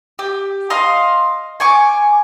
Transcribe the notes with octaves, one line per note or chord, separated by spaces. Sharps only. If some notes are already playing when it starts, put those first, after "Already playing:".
G4
D#5 F5 C6
G#5 C#6 D6